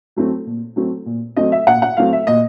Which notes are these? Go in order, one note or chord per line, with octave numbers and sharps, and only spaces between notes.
F#3 A3 C4
A#2
F#3 A3 C4
A#2
F#3 A3 C4 D#5
E5
A#2 F#5
F#5
F#3 A3 C4 F5
E5
A#2 D#5